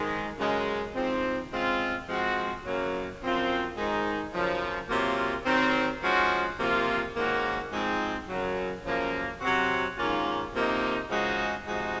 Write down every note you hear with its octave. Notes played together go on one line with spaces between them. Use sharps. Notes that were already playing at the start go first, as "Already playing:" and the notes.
Already playing: G#2 D#3 G#3
F#2 C#3 G#3
G#2 F3 C4
C#3 G#3 C4 F4
F3 G#3 C4 F#4
F#2 C#3 F#3 A#3
F#2 F3 C4 F4
G#2 D#3 G#3 D#4
F#2 C#3 F3
C3 F#3 A#3 F4
D#3 F#3 C4
F3 G#3 C#4 F#4
C3 F3 A#3 F4
G#2 D#3 A#3 C#4 F#4
G#2 F3 G#3 C4
F#2 C#3 F#3
F#2 C#3 F3 A#3
C3 F#3 C4 F#4
G#2 D#3 A#3 C#4 F4
C3 F3 A#3 D#4
C#3 F3 G#3 D#4 F#4
C3 F3 G#3 D#4 F#4